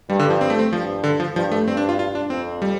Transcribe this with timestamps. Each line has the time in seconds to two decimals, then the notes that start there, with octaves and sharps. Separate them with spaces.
0.10 G2 G3
0.19 D3
0.30 F3
0.41 C4
0.50 A3
0.59 C4
0.73 G2 F3
1.04 D3
1.20 F3
1.36 G2 F3
1.51 A3
1.68 G2 C4
1.77 D4
1.89 F4
1.99 F4
2.15 D4
2.30 F2 C4
2.62 G3